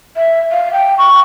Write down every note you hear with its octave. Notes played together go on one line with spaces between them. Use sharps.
E5
F5
G5
C#6